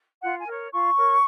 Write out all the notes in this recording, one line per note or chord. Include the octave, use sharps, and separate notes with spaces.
F4 F#5
G#5
A#4 C#5
F4 C#6
A#4 C#5